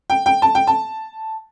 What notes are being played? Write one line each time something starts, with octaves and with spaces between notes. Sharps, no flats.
G5
G5
A5
G5
A5